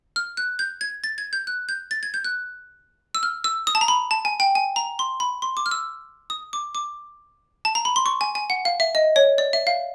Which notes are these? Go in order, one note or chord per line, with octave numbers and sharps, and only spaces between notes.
F6
F#6
G6
G#6
A6
G#6
G6
F#6
G6
A6
G#6
G6
F#6
E6
F6
E6
D#6
A5
A#5
B5
A5
G#5
G5
G#5
A#5
C6
B5
C6
D6
F6
E6
D#6
D6
D6
A5
A#5
B5
C6
C#6
G#5
G#5
F#5
F5
E5
D#5
C#5
D5
E5
F5